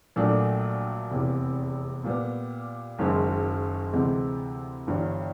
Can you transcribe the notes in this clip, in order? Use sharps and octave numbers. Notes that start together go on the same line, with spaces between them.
A#1 A#2 F#3 A3 D4
F1 E2 C3 E3
A#2 G3 B3
F#1 F#2 D#3 G#3
D2 C3 E3 G#3 C4
G1 G2 E3